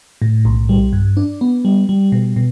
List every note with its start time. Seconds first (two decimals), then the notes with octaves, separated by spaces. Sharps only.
0.22 A2
0.45 B1
0.69 G3
0.93 G2
1.17 D4
1.41 B3
1.65 G3
1.89 G3
2.12 B2
2.36 B2